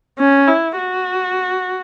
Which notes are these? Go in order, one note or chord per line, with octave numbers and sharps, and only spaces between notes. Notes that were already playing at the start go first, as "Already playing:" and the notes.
C#4
E4
F#4